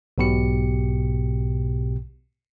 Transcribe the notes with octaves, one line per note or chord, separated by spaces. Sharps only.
B1 G#2 B2 G4 C#7